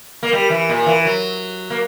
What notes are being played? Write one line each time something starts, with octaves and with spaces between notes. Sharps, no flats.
A#3
G3
E3
A#2
E3
F#3
A#3